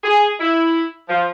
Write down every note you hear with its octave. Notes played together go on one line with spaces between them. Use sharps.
G#4
E4
F3